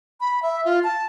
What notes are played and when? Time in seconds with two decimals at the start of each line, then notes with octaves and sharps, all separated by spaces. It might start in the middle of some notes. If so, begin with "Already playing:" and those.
0.20 B5
0.42 E5
0.65 F4
0.84 A5